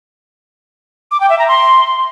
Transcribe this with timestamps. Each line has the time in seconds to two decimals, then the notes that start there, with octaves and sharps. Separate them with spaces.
1.11 D6
1.20 G5
1.30 E5
1.39 A#5
1.48 C6